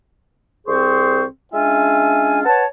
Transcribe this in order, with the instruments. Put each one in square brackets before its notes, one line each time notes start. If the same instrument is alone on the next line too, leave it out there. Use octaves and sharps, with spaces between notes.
[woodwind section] C2 C4 G#4 C5 C6 C#6
G#3 C#4 D4 F4 E5 G#5
B4 C#5 F#5 A5